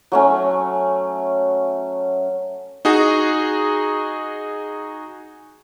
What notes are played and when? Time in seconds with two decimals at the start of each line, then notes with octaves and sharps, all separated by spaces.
0.12 F#3 A3 C#4
2.85 D#4 F#4 G#4